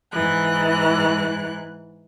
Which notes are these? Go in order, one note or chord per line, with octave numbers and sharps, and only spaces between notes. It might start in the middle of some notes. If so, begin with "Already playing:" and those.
G#2 E3 F#6